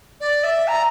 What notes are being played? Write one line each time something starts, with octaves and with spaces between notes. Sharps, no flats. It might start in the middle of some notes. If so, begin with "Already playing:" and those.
D5
E5
A#5